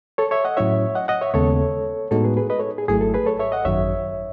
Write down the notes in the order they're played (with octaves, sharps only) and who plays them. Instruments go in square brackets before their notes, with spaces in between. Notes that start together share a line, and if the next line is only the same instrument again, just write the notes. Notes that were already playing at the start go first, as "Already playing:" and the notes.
[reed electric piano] A4 C#5
C#5 E5
D#5 F#5
[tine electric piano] A2 F#3 C#4 E4 [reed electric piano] C#5 E5
[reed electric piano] D#5 F#5
D#5 F#5
C#5 E5
[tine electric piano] D#2 C#3 G#3 B3 [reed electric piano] A4 C#5
[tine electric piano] A2 G#3 B3 D#4 F#4 [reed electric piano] A4
[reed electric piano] G#4 B4
G#4 B4
B4 D#5
A4 C#5
G#4
[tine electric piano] G#1 G#2 F#3 A3 E4 [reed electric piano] G#4
[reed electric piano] A4
G#4 B4
A4 C#5
C#5 E5
D#5 F#5
[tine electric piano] G#1 F#2 D#3 F#3 [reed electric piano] C#5 E5